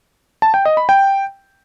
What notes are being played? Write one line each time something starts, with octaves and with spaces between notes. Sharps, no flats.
A5
G5
D#5
B5
G5